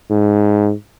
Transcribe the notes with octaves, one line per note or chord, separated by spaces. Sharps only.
G#2